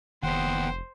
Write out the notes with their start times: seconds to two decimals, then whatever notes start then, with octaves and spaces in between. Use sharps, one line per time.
0.23 F1 D#2 B3 C5 F#5 G5